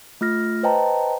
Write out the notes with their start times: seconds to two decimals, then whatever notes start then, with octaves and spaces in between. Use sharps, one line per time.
0.21 A3 F4 F6 A#6
0.63 B4 C5 D#5 G5 A5 A#5